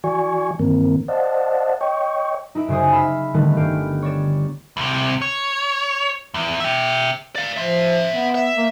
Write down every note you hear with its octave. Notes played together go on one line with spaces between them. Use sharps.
E3 F#4 D5 G#5 C#6
G2 D#3 E3 A#3 C4 A#4
C5 D5 D#5 F5 F#5 A5
C#5 D#5 G5 C#6
D#4 E4 E5 D7
F#2 C#3 C5 G#5 D#6
E5 F5 B5 E6
D3 D#3 G3 A3 B3 D#4
G1 G4 F5 D7
C#5 D5 A6 E7
C2 C3
C#5
E2
E5 G5
D5 F5
F3 E5 C6
B3
E5
A#3